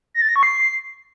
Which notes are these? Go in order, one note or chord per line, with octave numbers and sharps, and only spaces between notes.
A#6
A6
A#6
C#6
C7